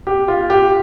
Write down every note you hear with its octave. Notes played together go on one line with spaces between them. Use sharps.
G4
F4
G4